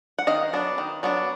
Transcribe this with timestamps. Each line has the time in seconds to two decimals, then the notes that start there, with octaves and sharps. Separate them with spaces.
0.19 F#5
0.27 D#3 D#5 F5
0.53 F#3 B3 D4
0.78 D#3
1.03 F#3 B3 D4